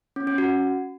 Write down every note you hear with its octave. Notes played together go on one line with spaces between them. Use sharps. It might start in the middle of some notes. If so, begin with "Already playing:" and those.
C#4
C#4
F#4